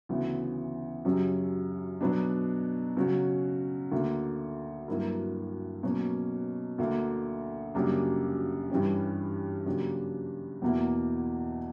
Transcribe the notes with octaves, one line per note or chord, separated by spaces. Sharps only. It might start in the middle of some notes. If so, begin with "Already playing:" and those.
D2 C#3 E3 B3
F#2 C#3 F#3 C#4 G4
B2 F#3 B3 D4
C#3 F#3 C#4 F#4
D2 D3 A#3
G2 F#3 A#3 E4 A#4
B2 F#3 A#3 C#4
D2 D3 A#3
F#2 C#3 G3 A#3 D4
G2 E3 G3 C#4 G4
C#3 F#3 A#3 D4 G4
E2 B2 A#3 E4